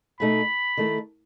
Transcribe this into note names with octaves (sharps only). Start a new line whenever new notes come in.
B2 A3 D#4 B5
D#3 A3 E4